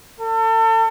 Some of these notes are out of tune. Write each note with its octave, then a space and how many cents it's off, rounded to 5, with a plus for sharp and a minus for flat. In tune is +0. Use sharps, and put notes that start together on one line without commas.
A4 +35